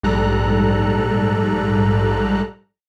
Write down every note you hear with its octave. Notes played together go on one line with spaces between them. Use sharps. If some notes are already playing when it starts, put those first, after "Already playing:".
A#1 G#2 G3 A4 A#5 F#6